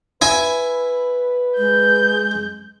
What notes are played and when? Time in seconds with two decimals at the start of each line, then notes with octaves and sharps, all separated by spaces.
0.22 E4 B4 E5 G#5
1.57 G#3 G6